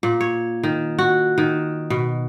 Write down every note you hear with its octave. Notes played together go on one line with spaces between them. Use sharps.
A#2
C#5
D#3
F#4
D#3
B2